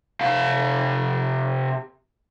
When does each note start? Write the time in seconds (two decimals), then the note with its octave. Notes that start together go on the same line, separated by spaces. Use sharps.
0.21 C3 F5